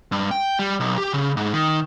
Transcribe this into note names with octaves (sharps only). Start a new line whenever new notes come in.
G2
G5
G3
B1
G4
C#3
G#2
D#3